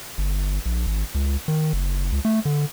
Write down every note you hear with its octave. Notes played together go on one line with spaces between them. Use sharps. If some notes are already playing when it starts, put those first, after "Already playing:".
G1
A#1
G#1
C#2
D#3
F#1
C#2
A3
D3